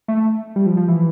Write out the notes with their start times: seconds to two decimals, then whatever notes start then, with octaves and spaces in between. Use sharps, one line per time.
0.08 A3
0.56 G3
0.66 F3
0.77 F3
0.88 E3